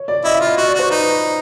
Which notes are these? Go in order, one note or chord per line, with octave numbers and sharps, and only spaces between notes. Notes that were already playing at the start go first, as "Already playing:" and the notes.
Already playing: C#5
D5
E4 D#5
E5
F4
D#5
F#4 D#5
D5
F#4 C5
D#4 B4